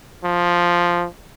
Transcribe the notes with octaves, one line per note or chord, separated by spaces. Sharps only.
F3